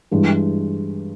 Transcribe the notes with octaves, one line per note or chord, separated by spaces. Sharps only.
G2 E3 G#3